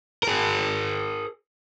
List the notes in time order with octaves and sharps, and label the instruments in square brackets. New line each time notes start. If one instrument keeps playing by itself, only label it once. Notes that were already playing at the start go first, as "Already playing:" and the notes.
[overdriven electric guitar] G#4 A#4